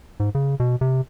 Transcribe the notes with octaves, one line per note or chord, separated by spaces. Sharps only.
G#2
C#3
B2
C3